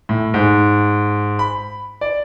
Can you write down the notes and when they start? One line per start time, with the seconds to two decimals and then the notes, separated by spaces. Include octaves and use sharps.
0.09 A2
0.34 G#2
1.39 B5
2.01 D5